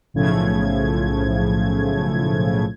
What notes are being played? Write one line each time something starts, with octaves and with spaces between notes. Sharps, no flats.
B1 A2 C#3 F3 A3 G#6